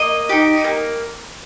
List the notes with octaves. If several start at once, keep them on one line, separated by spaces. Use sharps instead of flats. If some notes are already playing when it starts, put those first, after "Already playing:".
Already playing: A#3 D#5
D#4 G4
A#3